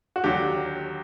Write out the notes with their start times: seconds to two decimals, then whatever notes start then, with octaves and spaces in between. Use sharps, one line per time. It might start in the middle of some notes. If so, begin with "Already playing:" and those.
0.16 F#4
0.24 D#2 D3 F#3 G4